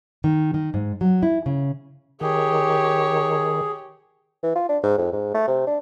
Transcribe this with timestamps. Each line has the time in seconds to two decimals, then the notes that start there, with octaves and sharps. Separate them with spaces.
0.24 D#3
0.54 D#3
0.74 G#2
1.01 F#3
1.23 E4
1.46 C#3
2.21 D#3 G4 G#4 C#5
4.43 E3
4.55 F4
4.69 D4
4.83 G#2
4.98 F2
5.12 G#2
5.34 A3
5.48 C3
5.67 D4